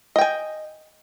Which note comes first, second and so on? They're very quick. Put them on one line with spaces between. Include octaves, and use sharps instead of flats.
D#5 G5 G#5